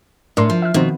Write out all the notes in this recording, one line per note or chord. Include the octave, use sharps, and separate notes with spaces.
A2 D4 A#4 C6
F3
E5 F6
B2 D#3 F3 C4